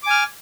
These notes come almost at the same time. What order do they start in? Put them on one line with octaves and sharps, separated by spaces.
D6 G#5 F6